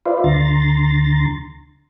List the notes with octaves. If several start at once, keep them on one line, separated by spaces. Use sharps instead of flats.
F4 B4 C5 D5 E5 F5
D2 D3 A#5 C6 A6